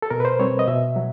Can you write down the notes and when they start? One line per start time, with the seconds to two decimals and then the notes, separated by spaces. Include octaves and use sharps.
0.02 A4
0.10 B2 A#4
0.20 B4
0.25 C5
0.39 G3 C4 C#5
0.59 D#5
0.68 B2 E5
0.96 F#3